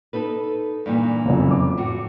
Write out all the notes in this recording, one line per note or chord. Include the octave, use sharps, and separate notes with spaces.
D#4 A4 B4
G2 A#2 E3
F#1 F2
D6
A2 F#4